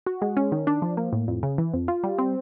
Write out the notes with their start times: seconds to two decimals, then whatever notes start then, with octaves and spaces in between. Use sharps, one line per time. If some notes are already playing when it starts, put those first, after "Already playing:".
0.06 F#4
0.22 G#3
0.37 C#4
0.52 D#3
0.67 D4
0.82 F3
0.97 A#3
1.13 A2
1.28 F2
1.43 C#3
1.58 E3
1.74 F2
1.88 F4
2.04 G3
2.18 C4